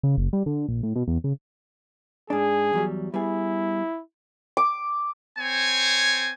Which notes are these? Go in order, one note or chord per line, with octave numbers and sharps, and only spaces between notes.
C#3
F#1
G3
D3
A#1
A2
B2
E2
C#3
G#2 D4 G#4
E2 F#3 G3
G3 B3 E4 G#4
D6
C4 C5 C#5 G#5